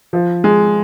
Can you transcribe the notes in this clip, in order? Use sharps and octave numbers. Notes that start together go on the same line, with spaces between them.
F3
G#3